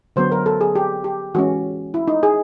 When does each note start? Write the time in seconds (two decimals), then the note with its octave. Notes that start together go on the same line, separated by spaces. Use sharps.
0.16 D3 F#3 B3 C5
0.32 A#4
0.46 A4
0.61 G#4
0.75 G4
1.04 G4
1.35 E3 G#3 C#4 F#4
1.94 E4
2.08 D#4
2.23 G#4